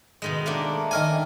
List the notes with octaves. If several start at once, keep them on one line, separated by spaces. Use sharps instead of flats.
B2 D#3 G#3
A3 A#3 D4
D#3 A#4 G#5